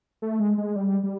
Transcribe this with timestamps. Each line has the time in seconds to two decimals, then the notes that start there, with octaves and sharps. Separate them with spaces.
0.22 A3
0.40 G#3
0.58 G#3
0.76 G3
1.03 G3